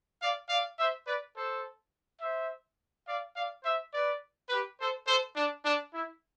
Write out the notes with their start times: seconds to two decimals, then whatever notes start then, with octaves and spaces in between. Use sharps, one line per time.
0.20 D5 F5
0.49 D5 F5
0.78 C5 E5
1.06 B4 D5
1.35 A4 C5
2.20 C5 E5
3.06 D5 F5
3.35 D5 F5
3.63 C5 E5
3.93 B4 D5
4.49 G4 B4
4.78 A4 C5
5.06 A4 C5
5.35 D4
5.64 D4
5.93 E4